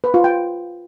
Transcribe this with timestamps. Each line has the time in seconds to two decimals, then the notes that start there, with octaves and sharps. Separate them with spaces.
0.04 B4
0.14 F4
0.24 G5